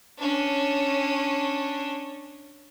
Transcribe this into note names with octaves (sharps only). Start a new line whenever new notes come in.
C#4 D4